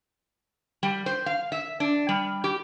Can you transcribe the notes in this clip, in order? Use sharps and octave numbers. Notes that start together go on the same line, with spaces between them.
G3
C5
F5
E5
D4
G3
G4